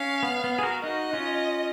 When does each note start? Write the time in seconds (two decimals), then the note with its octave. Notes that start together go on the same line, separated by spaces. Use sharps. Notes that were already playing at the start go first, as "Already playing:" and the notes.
Already playing: C#4 F5
0.23 B3
0.44 B3
0.59 G#4
0.63 F#4 A#4
0.84 D#4 F#4 D#5
1.13 C#4 F4